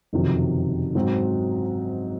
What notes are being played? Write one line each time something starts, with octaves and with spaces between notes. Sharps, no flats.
F#1 F2 C3 D#3 F#3
G#2 F#3 C4 F#4